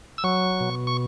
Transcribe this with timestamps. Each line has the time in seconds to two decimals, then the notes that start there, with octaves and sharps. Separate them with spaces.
0.18 E6
0.24 F#3 C#6
0.60 B2
0.87 C#6